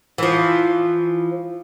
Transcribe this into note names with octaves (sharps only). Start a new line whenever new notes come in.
E3 F3